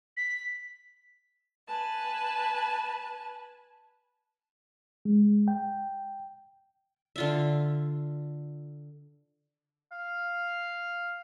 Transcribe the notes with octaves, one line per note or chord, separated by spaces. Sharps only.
B6
B4 G#5 A5
G#3
G5
D3 F4 E5
F5